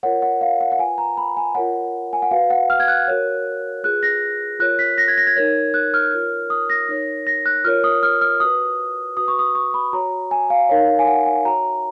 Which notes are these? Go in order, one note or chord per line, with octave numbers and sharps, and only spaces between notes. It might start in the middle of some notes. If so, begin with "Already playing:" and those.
F4 A#4 C#5 F#5
F#5
F5
F#5
F#5
F4 B4 G#5
A#5
B5
G#5
F4 A#4 C#5 F#5
G#5
F#5
F#4 B4 F5
F#5
F6
G#6
F#6
F#4 A#4 C#5
F4 G#4 B4 F#6
A#6
F4 A#4 C#5 F#6
B6
A#6
G#6
A#6
G#6
D#4 A#4 C#5
F#6
F6
F4 A#4 C#5
D#6
A#6
D#4 A#4 C#5
A#6
F#6
F4 A#4 C#5 F6
D#6
F6
F6
F#4 B4 D#6
F#4 B4 D#6
C#6
D#6
C#6
B5
F#4 C#5 A#5
G#5
F5
D#4 A#4 C#5 F5
G#5
F#5
G#5
F#4 C#5 A#5